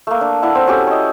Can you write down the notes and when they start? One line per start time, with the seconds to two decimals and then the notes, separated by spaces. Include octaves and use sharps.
0.07 A3 A#3
0.21 D4
0.42 D4 E4 F#5
0.55 C4
0.67 C#4 F#4 G4 A4
0.87 C#5 D#5